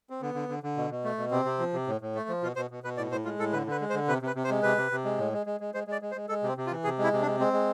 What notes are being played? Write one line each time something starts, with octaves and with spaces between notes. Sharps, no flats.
C4
D3 B3
D3
D3
D3
B2
B2
A3
B2
C3 C4
C3
F3
C3
A2
A2
A3
F3
B2 F4
B2 C5
B2
B2 B4
A2 D5
A2 C5
G#3 F4
A2 A4
D3 B4
D3 B4
G#3
C5
D3
C3 B4
C3
B4
C3
C5
G#3
C3 B4
C3
C3
G#3
A2
G#3
G#3
G#3
G#3 C5
G#3 D5
G#3
C5
G#3
G#3 A4
C3
C4
C3
F4
E3
C3 G#4
G#3
E4
C3
D4
G#3
G#3 C4
G#3